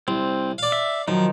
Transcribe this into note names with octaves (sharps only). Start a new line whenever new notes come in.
C2 C4
D5 F5
E5
F#2 D#3 F3 D#4